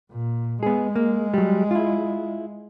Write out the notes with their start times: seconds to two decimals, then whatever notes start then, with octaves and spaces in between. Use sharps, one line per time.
0.12 A#2
0.63 G#3 B3 G#4
0.96 A#3
1.34 F#3 G3
1.71 E4 F4